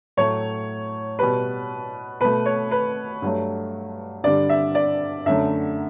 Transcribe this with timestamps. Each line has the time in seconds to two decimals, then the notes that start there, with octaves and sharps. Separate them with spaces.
0.17 A2 F#3 A3 C#5
1.19 B2 G3 B4
2.21 B2 A3 B4
2.46 C#5
2.71 B4
3.22 G2 F#3 A3
4.24 G2 D3 G3 D5
4.49 E5
4.75 D5
5.26 F#2 D3 F#3 A3 E5